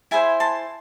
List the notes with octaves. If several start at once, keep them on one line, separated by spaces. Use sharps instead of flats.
E4 G#4 C5 G#5 B5
A5 C6